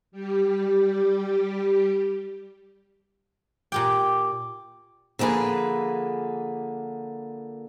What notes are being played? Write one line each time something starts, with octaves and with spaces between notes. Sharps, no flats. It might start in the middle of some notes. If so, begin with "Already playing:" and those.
G3 G4
A#2 G4 G5 D6
D3 F3 A#3 G#4 B4